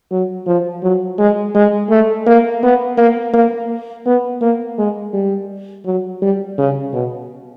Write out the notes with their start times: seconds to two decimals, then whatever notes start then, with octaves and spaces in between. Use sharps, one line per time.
0.11 F#3
0.47 F3
0.83 F#3
1.19 G#3
1.55 G#3
1.90 A3
2.27 A#3
2.63 B3
2.98 A#3
3.34 A#3
4.06 B3
4.41 A#3
4.78 G#3
5.13 G3
5.85 F#3
6.22 G3
6.58 C#3
6.93 B2